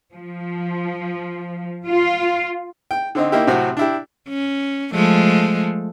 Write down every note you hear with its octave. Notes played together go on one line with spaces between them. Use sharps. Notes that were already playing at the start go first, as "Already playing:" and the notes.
F3
F4
G5
D3 C4 D#4
A#3 D#4 E4 G4
A2 C3 F#3 C4 F#4
D4 E4 G4
C#4
F3 G#3 A3